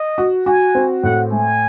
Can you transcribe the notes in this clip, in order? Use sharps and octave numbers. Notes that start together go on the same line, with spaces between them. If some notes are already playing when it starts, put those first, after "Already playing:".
Already playing: D#5
F#4
F#4 G#5
C4
A2 F#5
A3 G#5